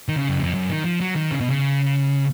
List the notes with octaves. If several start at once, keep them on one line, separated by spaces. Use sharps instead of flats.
D#3
C#3
F#2
F2
F#2
D#3
F3
F#3
D#3
C#3
B2
C#3